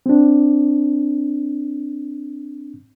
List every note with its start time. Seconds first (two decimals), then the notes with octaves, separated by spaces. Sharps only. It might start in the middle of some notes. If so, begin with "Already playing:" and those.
0.06 C4 D4